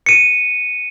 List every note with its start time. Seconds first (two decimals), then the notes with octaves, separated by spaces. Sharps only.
0.06 C#7 D#7